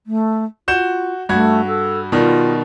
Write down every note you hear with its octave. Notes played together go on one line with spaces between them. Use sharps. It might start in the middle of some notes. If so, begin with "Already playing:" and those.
A3
F4 F#4 G6 E7
G2 A3 F#4 G#6
A4
B2 D#3 G3 F4